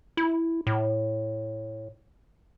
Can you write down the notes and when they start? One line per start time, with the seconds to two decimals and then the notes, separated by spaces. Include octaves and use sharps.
0.17 E4
0.67 A2